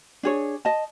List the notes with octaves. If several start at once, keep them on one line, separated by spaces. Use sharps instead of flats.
D4 G#4 C#5
D#5 A5